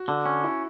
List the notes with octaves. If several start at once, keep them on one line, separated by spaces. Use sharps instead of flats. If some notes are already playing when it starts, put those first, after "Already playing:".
Already playing: F#4
D3
C#4
E4